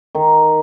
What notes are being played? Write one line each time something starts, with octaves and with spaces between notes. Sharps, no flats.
D#3